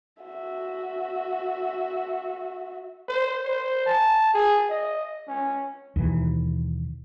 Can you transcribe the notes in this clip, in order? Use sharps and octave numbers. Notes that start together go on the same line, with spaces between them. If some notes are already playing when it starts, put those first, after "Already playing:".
F#4 E5
C5
C5
A5
G#4
D#5
C#4
D#2 B2 E3